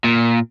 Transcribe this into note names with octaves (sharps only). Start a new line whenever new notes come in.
A#2